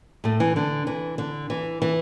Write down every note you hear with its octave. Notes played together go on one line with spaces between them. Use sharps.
A2 A3
E3
D3
E3
D3
E3
E3